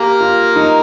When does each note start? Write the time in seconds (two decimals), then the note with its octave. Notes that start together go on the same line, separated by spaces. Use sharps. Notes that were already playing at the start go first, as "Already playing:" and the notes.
Already playing: A#3 G4 A#4
0.21 F4
0.56 D#4